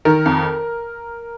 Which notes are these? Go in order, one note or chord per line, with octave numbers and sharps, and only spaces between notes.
D#3 A#4
F2